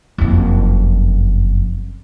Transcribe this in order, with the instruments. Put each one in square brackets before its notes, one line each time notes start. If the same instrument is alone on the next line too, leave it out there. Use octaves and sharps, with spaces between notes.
[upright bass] F#1 F2